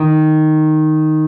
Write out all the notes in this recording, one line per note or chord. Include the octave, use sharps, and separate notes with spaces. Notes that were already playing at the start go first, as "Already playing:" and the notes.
Already playing: D#3